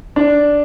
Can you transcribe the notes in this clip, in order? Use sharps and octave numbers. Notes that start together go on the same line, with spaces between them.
D4